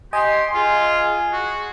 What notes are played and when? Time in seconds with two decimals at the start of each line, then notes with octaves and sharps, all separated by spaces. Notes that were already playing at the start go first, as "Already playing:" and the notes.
0.13 G4 D#5 G#5 C6
0.54 F4 G#4
1.33 F#4